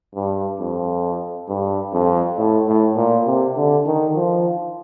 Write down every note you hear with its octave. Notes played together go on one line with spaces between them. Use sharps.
G2
F2
G2
F2
A2
A2
A#2
C3
D3
D#3
F3